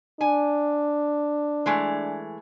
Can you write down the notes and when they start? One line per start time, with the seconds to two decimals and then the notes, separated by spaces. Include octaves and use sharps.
0.21 D4 G#5
1.66 E3 G#3 A3